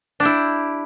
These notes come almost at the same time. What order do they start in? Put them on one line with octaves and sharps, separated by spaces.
D4 G4 E4